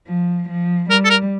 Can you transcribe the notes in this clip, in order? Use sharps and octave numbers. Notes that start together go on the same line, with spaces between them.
F3
F3
G3 A#4
A4
A#4